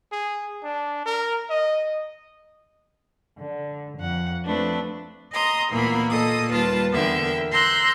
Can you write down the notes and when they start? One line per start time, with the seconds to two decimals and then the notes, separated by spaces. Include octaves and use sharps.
0.12 G#4
0.63 D4
1.05 A#4
1.50 D#5
3.39 D3
3.97 F2 F#5
4.44 F3 A3 C4 D4 B4
5.32 D#5 A#5 C6 D#6
5.70 D2 A#2 E3 A#3 B3 B5
6.10 A#2 A4 D#5 D#6
6.50 D#2 G3 F4 B4 A5
6.93 E2 D3 B3 A#4 E5 G5
7.53 A#5 C6 E6 F#6 G6